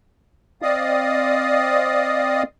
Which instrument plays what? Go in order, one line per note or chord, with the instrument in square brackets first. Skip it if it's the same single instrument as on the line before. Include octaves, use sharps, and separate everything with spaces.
[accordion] C4 D5 D#5 F5 D#6